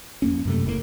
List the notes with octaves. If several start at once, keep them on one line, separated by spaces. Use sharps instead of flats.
F2 A#3 C#4
F#2 C3 A3
F#1 A2 C3 A#3